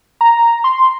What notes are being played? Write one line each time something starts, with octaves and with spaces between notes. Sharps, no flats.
A#5
C6